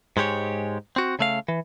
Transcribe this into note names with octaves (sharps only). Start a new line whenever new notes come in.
G#2 G#3 G4 C#5
C4 F#4
C#3 A3 F5
E3